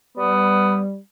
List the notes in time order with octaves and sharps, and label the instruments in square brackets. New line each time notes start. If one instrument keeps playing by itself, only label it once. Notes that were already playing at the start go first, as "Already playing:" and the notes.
[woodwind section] G3 [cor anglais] B3